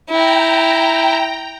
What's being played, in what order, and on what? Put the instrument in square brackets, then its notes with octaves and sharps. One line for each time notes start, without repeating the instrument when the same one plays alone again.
[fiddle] E4 [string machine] G5 A#5